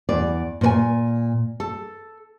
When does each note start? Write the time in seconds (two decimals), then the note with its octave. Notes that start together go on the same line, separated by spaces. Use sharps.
0.09 E2 D5
0.61 A#2 B4 G#5
1.60 A4